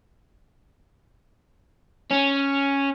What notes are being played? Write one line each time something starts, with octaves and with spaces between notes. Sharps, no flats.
C#4